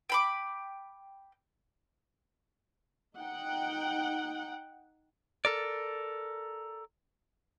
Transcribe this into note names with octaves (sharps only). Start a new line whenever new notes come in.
G5 B5 D6
D#4 F#5 G5
A4 A#4 D5